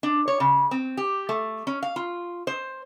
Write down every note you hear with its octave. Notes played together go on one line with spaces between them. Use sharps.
D4
C#5
C#3
C4
G4
A3
C#4
F5
F4
C5